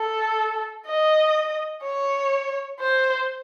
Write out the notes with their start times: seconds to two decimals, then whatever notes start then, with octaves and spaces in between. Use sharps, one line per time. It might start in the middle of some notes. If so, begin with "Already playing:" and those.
Already playing: A4
0.87 D#5
1.83 C#5
2.80 C5